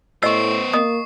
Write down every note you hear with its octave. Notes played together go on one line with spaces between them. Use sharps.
A2 B3 C5 D#5 C#6 E6 C7
A#3 D#5 D#6